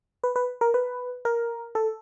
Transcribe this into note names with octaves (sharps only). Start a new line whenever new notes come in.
B4
B4
A#4
B4
A#4
A4